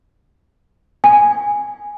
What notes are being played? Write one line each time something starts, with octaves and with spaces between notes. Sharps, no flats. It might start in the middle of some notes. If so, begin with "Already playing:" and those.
G#5